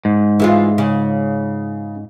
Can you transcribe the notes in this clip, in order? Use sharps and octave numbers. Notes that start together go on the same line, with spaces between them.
G#2
E3 G#3 F4
C#3